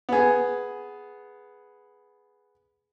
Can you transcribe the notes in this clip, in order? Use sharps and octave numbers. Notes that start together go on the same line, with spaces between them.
B3 G#4